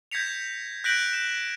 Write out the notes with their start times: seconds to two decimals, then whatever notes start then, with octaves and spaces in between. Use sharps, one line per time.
0.11 G6 G#6 A#6 B6 C#7 F7
0.84 F#6 G6 A#6 B6 D7 F#7
1.13 F#6 E7